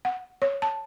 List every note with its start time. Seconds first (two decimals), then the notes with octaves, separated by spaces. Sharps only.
0.05 F#5
0.42 C#5
0.62 A5